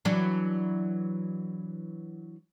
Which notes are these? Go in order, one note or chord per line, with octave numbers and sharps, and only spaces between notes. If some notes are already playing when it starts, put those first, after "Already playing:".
E3 F#3 D4